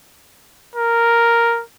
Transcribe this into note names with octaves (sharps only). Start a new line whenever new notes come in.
A#4